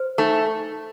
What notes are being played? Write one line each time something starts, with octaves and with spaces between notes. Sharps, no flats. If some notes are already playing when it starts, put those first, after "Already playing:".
Already playing: C5
A3 D#4